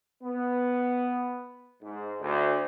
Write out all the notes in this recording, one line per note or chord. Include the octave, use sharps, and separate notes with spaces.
B3
G#2
D2